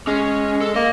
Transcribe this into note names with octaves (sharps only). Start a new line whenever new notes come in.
G#3 C#4
A4
A#3 D#5